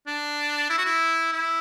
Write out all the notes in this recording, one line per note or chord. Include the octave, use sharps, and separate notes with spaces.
D4
E4
F#4
E4
E4